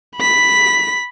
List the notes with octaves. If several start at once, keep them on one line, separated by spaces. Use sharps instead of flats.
B5 B6